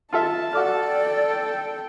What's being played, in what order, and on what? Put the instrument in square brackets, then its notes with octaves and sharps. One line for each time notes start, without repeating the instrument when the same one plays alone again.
[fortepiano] F4 A4 E5 [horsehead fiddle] A5
[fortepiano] F#4 D6 F6 [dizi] A4 [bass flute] D5
[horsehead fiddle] G5